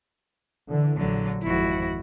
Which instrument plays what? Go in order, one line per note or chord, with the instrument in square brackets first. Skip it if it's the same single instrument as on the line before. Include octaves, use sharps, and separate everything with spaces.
[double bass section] D3 E3
[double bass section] A#1 [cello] D3 F#3
[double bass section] G#1 F2 [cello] E4 F#4